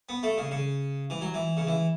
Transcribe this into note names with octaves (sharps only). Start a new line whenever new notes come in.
B3
A3
C#3
C#3
E3
F#3
E3
C#3
E3